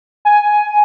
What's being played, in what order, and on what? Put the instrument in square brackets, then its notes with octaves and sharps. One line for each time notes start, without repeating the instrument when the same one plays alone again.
[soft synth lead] G#5